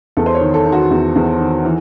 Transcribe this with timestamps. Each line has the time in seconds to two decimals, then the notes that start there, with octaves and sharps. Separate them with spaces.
0.17 E2 A4
0.26 C5
0.35 C#5
0.41 D#3
0.54 A4
0.65 D#3
0.72 F#4
0.91 E2
1.16 E2
1.40 D#3
1.65 E3